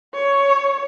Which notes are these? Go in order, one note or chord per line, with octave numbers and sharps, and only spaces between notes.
C#5